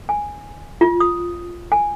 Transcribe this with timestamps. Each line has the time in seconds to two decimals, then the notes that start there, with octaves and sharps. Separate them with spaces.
0.09 G#5
0.81 F4
1.00 D#6
1.72 G#5